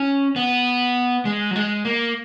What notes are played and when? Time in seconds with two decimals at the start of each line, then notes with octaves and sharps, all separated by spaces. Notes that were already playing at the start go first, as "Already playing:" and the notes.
Already playing: C#4
0.36 B3
1.25 G#3
1.51 F#3
1.56 G#3
1.85 A#3